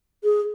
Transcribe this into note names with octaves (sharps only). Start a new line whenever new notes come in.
G#4